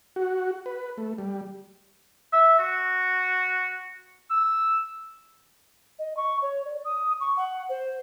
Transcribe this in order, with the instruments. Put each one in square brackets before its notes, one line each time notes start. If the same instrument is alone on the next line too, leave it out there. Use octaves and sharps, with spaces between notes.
[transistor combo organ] F#4
B4
A3
G3
[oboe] E5
F#4
E6
[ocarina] D#5
C#6
C#5
D5
D#6
C#6
F#5
C5